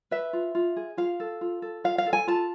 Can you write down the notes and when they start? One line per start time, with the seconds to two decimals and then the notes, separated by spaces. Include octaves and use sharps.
0.11 B4 E5
0.33 F4
0.55 F4
0.76 G#4
0.97 F4 F5
1.20 A4
1.41 F4
1.62 A4
1.84 F4 F5
1.98 F5
2.06 A4
2.13 G#5
2.27 F4 A5